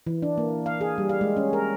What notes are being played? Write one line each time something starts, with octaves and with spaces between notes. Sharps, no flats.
E3
D4
A#3
F5
G#4
G3
F5
G#3
C#4
A#4